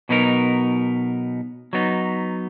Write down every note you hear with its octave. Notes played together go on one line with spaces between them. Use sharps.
B2 F#3 B3 D#4 A#4
F#3 B3 D#4